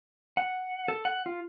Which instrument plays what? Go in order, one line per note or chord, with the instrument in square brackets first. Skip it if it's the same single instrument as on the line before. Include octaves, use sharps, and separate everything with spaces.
[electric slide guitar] F#5
A4
F#5
F4